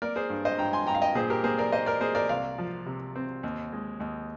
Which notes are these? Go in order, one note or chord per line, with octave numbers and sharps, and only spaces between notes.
A#3 A#4 D5
G#4 C5
G2
C5 D#5
G2 G5 A#5
G#5 C6
G2 G5 A#5
F5
D#5 G5
A#2 G#4 C5
G4 A#4
A#3 G#4 C5
A#4 D5
A#3 C5 D#5
A#4 D5
A#3 G#4 C5
A#4 D5
C2 D5 F5
F3
C3
C4
D#2
G#3
D#2